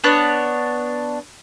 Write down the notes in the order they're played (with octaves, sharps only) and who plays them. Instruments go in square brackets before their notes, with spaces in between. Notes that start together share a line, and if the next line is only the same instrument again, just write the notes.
[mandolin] B3 D4 C#5 F#6